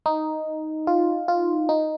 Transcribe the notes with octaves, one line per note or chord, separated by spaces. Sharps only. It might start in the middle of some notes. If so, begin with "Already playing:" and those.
D#4
F4
F4
D#4